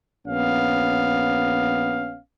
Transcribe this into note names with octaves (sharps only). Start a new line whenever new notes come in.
A#1 B3 C#4 F5